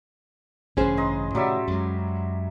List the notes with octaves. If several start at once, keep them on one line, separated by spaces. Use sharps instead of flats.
A1 G2 C#3 C#4 G#4 C5
D#5 A#5 C6
A2 C3 D#3 F#3 G3 E5
F#2 G#3